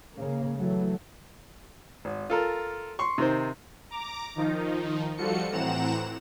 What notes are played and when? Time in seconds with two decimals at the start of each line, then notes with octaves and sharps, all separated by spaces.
0.14 C#3 A#3
0.58 E3 F#3 A3
2.05 G#1
2.30 F4 A4 A#4
2.99 C6 C#6
3.18 C3 D#3 C5
3.91 A#5 D6
4.36 D#3 F3 D#4
5.17 F3 G3 F4 F#4 A4 C#7
5.52 A2 E3 C4 F#5 A#5 E7